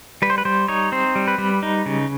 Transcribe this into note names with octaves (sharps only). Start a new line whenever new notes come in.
G3 B4
C5
B4
G3 C5
D#4 C#5
C4 C5
G3
B4
G3
D#4
C#3